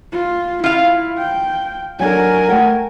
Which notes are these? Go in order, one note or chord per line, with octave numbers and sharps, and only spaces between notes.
F4
E4 F4 F5
G5
F#3 D4 A4 A#4 G#5
A3 F#5 G5